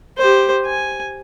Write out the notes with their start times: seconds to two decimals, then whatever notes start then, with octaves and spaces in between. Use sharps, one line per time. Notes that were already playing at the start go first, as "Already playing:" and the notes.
0.18 G4 C5
0.66 G#5